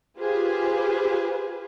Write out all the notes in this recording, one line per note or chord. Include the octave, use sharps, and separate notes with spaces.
F4 G4 G#4 B4 C5